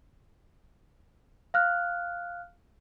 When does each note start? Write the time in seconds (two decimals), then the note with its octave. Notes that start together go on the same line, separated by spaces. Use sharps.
1.54 F5 F6 F#6